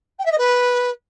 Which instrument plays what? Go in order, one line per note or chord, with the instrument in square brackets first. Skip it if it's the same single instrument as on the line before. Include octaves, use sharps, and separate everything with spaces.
[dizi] G5
E5
D#5
B4